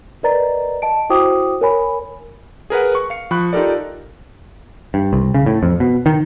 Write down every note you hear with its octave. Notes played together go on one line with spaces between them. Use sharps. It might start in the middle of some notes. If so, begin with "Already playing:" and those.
A#4 B4 D5 D#5 A#5 A6
D#5 A5 D7
E4 F#4 C5 G5 D6 D#6
A#4 C#5 G#5 B5
G#4 A#4 B4 F#5
C#6
F5 C#7
F3 B5 C#6 F#6
D#4 F4 G4 A4 A#4 D5
G2
C2
C#3
A2
F2
B2
D#3